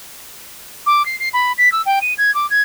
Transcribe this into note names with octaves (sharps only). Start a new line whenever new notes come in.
D6
C7
C7
B5
B6
E6
G5
D#7
G#6
D6
G#6